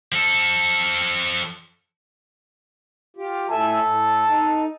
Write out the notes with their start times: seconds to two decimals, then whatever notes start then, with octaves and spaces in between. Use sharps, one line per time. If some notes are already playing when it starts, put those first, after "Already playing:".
0.12 F3 A4
3.17 F4 G4
3.51 A2 A4 E5 G#5
3.84 A2
4.28 D#4